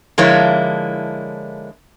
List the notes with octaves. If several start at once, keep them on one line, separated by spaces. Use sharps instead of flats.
D3 F3 G#3 A#3 E4 C#5